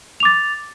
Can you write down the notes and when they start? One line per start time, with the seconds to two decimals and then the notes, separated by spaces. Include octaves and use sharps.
0.20 F7
0.23 D6
0.25 A6